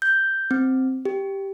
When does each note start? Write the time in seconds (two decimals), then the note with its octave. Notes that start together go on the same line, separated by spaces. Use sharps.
0.02 G6
0.51 C4
1.05 G4